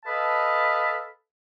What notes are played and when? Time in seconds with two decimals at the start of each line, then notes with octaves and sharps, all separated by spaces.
0.05 A4 B4 D#5 F5 A5 B5